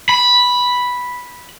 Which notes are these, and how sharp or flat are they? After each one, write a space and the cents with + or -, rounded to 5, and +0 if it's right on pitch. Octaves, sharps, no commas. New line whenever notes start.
B5 -5